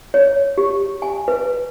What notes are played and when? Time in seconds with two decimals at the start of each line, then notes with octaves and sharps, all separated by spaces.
0.14 C#5
0.58 G4
1.02 G#5
1.28 B4